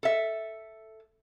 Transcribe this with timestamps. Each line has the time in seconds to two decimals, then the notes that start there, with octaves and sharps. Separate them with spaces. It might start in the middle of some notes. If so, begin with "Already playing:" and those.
0.03 A4 E5